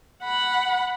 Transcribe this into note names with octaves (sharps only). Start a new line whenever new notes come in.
F#5 B5